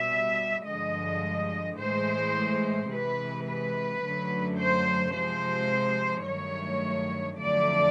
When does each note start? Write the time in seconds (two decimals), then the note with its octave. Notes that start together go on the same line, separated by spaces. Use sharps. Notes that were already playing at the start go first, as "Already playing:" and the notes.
Already playing: B2 G3 E5
0.66 G2 D3 F3 G#3 D#5
1.78 A2 E3 G#3 C5
2.90 C3 E3 G#3 B4
3.46 B4
4.02 F#2 D3 F#3 A3
4.58 C5
5.14 C3 F3 G#3 C5
6.26 G2 D#3 F#3 A3 C#5
7.38 F2 D3 F#3 A3 D5